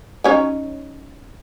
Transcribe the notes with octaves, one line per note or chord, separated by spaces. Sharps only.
F#3 C#4 D#4